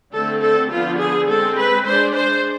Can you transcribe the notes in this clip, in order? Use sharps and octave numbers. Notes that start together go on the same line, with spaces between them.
D3 A3 C4 A4
A4
D3 F3 B3 F4
G#4
G#3 C4 A4
B4
G#3 D4 C5
C5